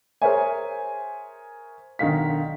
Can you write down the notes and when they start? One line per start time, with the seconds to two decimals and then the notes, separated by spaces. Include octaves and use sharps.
0.22 G#4 A#4 C5 C#5 E5 G#5
1.99 B1 D3 D#3 F5 B6